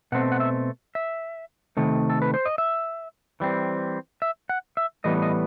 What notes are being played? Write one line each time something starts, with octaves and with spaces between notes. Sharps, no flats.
B2 A3 C4 F#5
F#5
E5
E5
C3 D#3 A3
A4
B4
C5
D#5
E5
E3 G3 C4
E5
F#5
E5
A2 E3 G3 B3 D#5
D#5